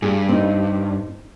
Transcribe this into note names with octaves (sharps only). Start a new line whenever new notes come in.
G2 G#4
C4 D#4